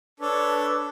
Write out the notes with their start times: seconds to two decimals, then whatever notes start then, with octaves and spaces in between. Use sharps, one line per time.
0.20 D4 A4 B4 C#5